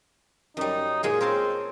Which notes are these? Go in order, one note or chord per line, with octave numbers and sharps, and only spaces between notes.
F#2 G3 D#4
A#2 G#3 F4 G#4
C4 A#4 C#5 A5